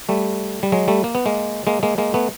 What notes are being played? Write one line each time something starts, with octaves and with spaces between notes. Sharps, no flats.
G3 A3
G3
F#3 G#3
G3 A3
A#3
B3
G#3 A#3
G#3 A#3
G#3 A#3
G#3 A#3
A3 B3